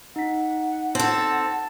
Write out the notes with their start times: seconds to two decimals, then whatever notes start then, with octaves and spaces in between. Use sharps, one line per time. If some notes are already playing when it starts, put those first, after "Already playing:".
0.16 D#4 F#5 B6
0.95 C4 A4 A5